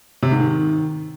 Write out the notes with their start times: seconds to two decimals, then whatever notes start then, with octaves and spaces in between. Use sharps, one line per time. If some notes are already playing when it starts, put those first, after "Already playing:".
0.23 C3
0.31 G#2
0.40 D#3